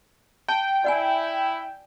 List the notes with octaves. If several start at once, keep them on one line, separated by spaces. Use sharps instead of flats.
G5 A5
E4 D5 F#5 G#5